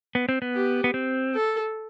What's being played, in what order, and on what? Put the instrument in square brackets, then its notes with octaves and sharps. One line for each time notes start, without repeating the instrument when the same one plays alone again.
[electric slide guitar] B3
C4
B3
[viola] G4
[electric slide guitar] B3
C4
[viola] A4